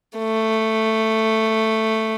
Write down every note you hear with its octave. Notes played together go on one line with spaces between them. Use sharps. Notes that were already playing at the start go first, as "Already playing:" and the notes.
A3